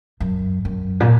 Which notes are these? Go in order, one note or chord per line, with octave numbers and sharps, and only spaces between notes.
F#2
F#2
A#2